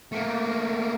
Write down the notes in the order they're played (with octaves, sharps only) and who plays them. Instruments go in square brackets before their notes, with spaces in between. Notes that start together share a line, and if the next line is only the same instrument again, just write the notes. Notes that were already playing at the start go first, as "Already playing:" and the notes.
[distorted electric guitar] A3 A#3